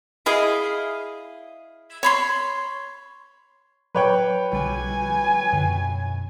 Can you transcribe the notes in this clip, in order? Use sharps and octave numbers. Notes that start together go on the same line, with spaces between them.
E4 G#4 D#5 F5
C#5 B5 C6
F#3 B4 C#5 G5
B1 D3 G3 G#5
F#2 B2 D3